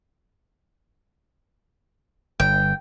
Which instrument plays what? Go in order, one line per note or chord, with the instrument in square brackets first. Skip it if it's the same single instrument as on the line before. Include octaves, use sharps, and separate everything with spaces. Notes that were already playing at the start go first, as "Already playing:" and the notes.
[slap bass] G1 [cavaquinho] G5